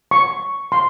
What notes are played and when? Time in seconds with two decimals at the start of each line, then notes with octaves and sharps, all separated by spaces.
0.11 C#6
0.72 C6